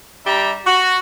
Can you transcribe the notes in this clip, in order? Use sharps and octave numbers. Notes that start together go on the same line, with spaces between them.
G3 D4 G4 E5 A#5
F#4